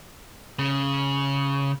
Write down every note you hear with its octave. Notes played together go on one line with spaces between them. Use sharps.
C#3